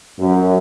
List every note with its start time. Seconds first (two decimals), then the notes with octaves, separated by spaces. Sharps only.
0.20 F#2